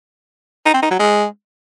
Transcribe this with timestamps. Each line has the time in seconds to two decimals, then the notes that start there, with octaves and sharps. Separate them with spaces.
0.65 D#4
0.74 C4
0.82 D#4
0.91 F#3
0.99 G#3